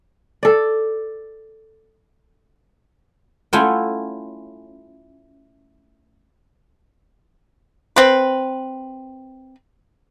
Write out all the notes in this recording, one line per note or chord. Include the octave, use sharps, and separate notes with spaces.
A4 D5
A3 C#4 E4 F4 F#5 G5
C4 B4